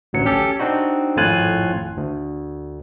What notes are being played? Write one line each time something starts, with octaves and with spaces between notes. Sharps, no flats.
A1 D2 F#3 C#7
C#4 G4 A4
C4 D4 D#4 F#4
G#1 F2 A2 F4 G#5 F#6
D2